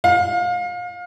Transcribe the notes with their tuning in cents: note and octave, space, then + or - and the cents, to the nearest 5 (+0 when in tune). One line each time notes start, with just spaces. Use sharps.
F5 +30